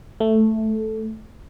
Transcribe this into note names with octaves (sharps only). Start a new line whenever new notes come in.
A3